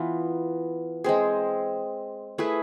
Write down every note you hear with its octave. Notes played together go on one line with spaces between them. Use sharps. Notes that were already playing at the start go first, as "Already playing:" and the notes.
Already playing: E3 B3 F4
G#3 C4 G#4
A3 E4 G#4 B4